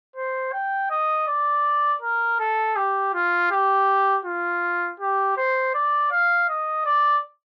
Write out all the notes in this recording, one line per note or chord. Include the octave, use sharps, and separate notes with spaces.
C5
G5
D#5
D5
A#4
A4
G4
F4
G4
F4
G4
C5
D5
F5
D#5
D5